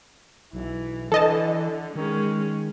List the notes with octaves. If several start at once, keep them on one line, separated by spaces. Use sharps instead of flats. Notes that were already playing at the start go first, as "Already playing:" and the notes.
B1 E3
D3 E3 A4 D#5 A5
D#3 G#3 C#4